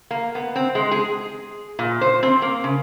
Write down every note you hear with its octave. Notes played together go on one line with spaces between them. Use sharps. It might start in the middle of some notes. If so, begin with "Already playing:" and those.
A#3
B3
C4
G#3
G#4
A#2
C5
C4
A#3
C#3